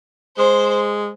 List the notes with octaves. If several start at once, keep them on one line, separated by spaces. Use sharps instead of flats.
G#3 C5